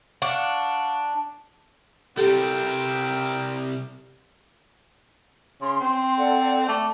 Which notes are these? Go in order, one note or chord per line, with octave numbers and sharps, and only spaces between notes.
D4 F5 F#5 C#6
C3 G3 C4 G4 A4 A#4 G5
C#3 C6
C4
A4 D5 F#5
A3 D5 D6